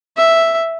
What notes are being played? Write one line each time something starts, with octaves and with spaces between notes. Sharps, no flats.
E5